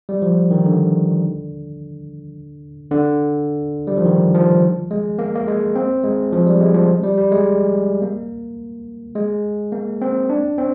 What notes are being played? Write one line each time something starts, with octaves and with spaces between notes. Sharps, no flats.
G3
F3
D#3
D3
D3
G3
F3
D#3
F3
G#3
A#3
A#3
G#3
C4
G#3
F3
G3
G#3
F3
G3
G3
G#3
A#3
G#3
A#3
C4
D4
C4